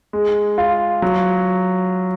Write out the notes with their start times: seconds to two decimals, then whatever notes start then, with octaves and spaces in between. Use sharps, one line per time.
0.13 G#3
0.58 F4
1.02 F#3